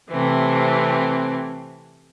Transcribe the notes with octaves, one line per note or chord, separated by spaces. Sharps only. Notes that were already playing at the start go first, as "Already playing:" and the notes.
C3 E3 A3 C4